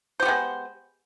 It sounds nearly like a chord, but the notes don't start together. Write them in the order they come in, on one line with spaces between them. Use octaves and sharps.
C5 G4 B3 G#3